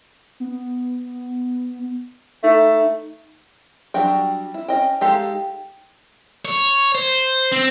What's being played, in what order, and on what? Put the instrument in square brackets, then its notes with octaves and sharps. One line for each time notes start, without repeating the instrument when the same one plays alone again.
[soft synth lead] B3
[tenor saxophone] A3 [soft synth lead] D#4
[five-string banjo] F#3 G3 D4 F#4 G5
E4
C#4 D#5 G5
G#3 D#4 G4 A4 F5
[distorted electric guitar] C#5
C5
C4